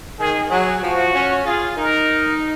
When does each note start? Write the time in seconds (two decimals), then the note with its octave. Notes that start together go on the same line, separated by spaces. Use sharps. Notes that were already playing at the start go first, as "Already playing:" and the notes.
0.19 D#3 G#4
0.50 F#3 G#4
0.82 F3 F#4
1.13 C#4
1.45 F4 G#4
1.76 D#4 A#4